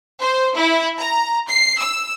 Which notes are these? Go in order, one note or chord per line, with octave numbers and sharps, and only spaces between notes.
C5
E4
A#5
C7
E6